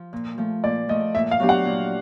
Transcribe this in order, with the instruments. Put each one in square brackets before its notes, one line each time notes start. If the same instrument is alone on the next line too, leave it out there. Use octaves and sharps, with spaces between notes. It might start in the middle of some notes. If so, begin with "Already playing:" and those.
Already playing: [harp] F3
A#2
F3 A3
[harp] A#2 [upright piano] D5
[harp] F3 A3 [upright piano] D#5
[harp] A#2 [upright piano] E5
[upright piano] F5
[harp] F#3 B3 D4 G4
[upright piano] F#5
[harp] A#2